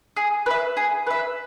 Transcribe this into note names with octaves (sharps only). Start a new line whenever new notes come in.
G#4
B4 E5
G#4
B4 E5